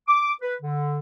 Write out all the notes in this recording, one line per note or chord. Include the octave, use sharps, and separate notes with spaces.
D6
B4
D3